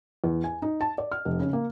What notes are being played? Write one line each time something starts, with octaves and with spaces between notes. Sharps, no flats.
E2
G#5
D#4
A5
D5
F6
F1
C#3
A#3